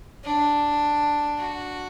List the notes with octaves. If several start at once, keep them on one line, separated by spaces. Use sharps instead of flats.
D4
F#4